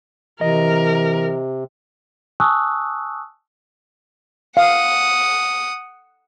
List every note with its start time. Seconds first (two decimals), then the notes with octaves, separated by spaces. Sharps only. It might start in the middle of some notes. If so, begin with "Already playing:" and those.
0.41 C3 E3 A#4 D#5
2.40 G#5 A5 C#6 D#6 E6 F#6
4.57 F5 F#5 D#6